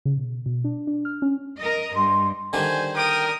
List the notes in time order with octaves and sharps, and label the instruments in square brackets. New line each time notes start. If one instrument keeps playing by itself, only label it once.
[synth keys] C#3
B2
B2
D4
D4
F6
C#4
[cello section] A#4 D#5
[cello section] G2 [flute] C6
[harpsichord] D3 D#3 G3 [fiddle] C5 [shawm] G#5
[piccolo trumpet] A#4 [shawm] G5 [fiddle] D#6